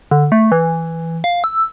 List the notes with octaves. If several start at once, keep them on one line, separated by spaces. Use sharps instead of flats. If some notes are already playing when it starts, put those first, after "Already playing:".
D3
A3
E3
F5
E6